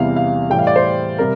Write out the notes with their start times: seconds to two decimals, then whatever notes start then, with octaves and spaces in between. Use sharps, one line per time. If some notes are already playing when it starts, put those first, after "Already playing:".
Already playing: E2 C3 E3 G3 F5
0.16 F5
0.50 A2 E3 G3 G5
0.59 F5
0.67 D5
0.76 C5
1.18 C3 G3 A#4